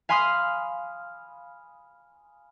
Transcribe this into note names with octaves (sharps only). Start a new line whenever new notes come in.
F5 G#5 B5 C6 D#6 F6